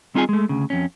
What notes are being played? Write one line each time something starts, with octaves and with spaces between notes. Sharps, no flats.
G3 C4 D#4 F4 G#4 G#5
G#3 A3
D2 C#3
F2 G#2 C#4